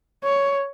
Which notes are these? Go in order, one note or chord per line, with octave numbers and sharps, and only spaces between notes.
C#5